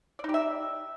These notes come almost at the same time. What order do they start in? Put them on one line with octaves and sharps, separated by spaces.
D5 D#4 G4 E5